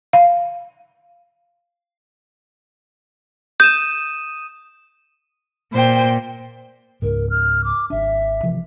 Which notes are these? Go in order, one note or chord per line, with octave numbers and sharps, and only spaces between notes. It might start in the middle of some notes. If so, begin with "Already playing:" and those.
F5
D#6 G6 D#7 E7
A#2 C5 G5
C#2 G#2 A#4
F6
D6
G#1 D4 E5
C3 E3 F3